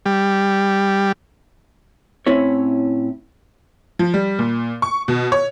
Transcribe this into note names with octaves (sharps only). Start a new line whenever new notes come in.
G3
A2 C4 C#4 E4 C#5
F3
G3
A#2
C#6
B2
C#5